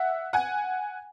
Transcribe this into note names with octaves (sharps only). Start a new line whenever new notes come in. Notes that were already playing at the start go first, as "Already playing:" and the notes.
Already playing: E5 F#5
F#5 G#5